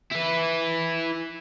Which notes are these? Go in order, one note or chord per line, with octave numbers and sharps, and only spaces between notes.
E4 B4